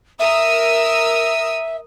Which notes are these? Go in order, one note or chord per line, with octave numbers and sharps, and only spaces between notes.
A#4 E5 D#6 E6